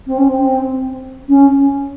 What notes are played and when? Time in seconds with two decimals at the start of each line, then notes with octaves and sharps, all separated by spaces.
0.07 C4
0.18 C#4
0.29 C4
1.29 C#4